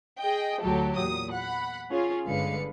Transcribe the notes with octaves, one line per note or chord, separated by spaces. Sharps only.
G#4 D#5 G5
D2 A2 F#3 G4 A4
E2 A#2 D#6
F#5 B5
C#4 F4 G#4 C#5
G1 D3 G#3 B4 F5 C#7